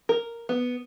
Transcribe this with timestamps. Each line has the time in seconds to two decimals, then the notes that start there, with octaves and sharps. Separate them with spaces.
0.09 A#4
0.49 B3